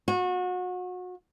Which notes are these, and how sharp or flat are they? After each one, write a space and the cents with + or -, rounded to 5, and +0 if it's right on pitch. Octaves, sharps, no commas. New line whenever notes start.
F#4 -30